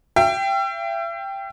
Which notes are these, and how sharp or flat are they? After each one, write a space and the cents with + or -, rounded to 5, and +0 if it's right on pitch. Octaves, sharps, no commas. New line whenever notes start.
E5 +40 G5 +0